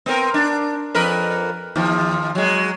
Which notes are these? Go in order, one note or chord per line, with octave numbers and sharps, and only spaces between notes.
B3 C4 A#4
D4
F2 A#4 B4
D#2 F3
F#3 G#3